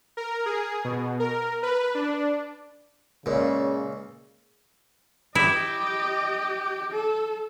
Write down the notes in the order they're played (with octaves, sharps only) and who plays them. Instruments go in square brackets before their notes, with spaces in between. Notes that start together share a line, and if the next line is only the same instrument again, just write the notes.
[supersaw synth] A#4
G#4
B2
A#4
B4
D4
[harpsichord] C#2 A#2 [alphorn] C#3
[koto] E4 [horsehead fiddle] G4 D#5
[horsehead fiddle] A4